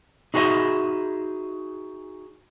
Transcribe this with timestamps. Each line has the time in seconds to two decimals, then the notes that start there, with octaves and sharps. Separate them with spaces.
0.34 D#4 F#4 G#4 C5 D#5 E5